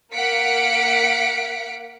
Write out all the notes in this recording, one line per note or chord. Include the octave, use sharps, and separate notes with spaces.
A#3 F5 F#5 B6 C#7 D7